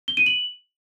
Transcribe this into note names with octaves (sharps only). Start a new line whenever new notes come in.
G7
D#7
F#7